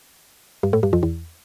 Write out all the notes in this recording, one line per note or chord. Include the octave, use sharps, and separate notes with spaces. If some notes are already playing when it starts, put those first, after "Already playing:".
G2
A2
G2
F2
E2